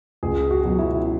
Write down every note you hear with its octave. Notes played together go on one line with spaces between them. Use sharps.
C#2 G#4
F#4
B2 F#3
E4